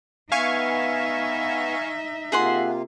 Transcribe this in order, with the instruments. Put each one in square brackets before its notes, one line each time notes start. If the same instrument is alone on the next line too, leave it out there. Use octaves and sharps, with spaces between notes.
[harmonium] B3 [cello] D#4 E5 [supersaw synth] F5 G#5 C#6
[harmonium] C3 A#3 F4 [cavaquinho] G#4 F#5 C6